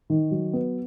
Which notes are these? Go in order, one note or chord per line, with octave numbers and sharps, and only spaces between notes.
D#3
F#3
B3